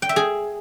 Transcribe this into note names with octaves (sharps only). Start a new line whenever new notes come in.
G5
E5
G#4